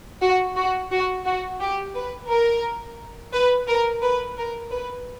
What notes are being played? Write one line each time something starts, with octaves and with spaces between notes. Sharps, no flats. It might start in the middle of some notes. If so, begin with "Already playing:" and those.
F#4
F#4
F#4
F#4
G4
B4
A#4
B4
A#4
B4
A#4
B4